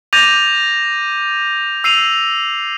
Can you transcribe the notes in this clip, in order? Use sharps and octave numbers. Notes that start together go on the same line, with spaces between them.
D6 G6 A6 A#6 D#7 F7
E6 C7 D#7 F7